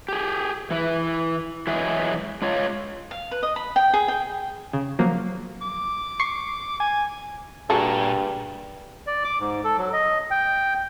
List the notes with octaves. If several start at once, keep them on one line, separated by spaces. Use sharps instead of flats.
G4 G#4
E3 E4 B4
E3 F#3 G#3 G#4 E5
G#3 F4 C#5 F5
F5
B4
D#5
B5
G5
G#4
G5
C#3
F3 F#3 A#3
D6
C#6 C7 C#7
G#5
G2 A#2 F#4 G#4 A4
D5
D6
G#2
A4
F#3
D#5
G5